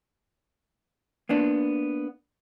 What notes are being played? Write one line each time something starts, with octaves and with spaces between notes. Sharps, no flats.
A#3 B3 D4